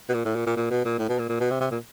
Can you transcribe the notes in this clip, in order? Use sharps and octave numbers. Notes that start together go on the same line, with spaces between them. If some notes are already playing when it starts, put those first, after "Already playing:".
B2
A#2
A2
A#2
A#2
A#2
B2
A#2
A2
B2
A#2
A#2
B2
C3
C3
A#2